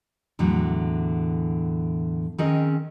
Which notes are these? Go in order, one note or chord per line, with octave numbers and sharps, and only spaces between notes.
E2 A2 D3 E3 F#3
D#3 C4 C#4 G#4 A#4 D#5